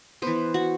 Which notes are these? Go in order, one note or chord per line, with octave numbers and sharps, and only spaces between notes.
E3 B3 C5
F#4